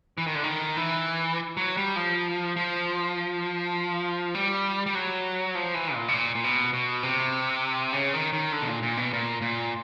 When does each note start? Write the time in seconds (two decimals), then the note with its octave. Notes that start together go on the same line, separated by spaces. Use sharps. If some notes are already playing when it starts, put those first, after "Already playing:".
0.18 E3
0.27 D#3
0.35 D3
0.44 D#3
0.77 E3
1.57 F#3
1.77 G3
1.96 F3
2.56 F3
4.35 G3
4.86 G3
4.95 F#3
5.55 F3
5.74 E3
5.94 A#2
6.08 B2
6.14 A#2
6.35 A#2
6.44 B2
6.73 B2
7.03 C3
7.93 C#3
8.13 D#3
8.33 D#3
8.52 D3
8.62 B2
8.68 A#2
8.83 A#2
8.97 B2
9.13 A#2
9.42 A#2